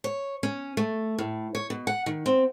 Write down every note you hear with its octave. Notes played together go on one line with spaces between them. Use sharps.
C#5
C#4
A3
A2
C#5
B2
F#5
D#3
C4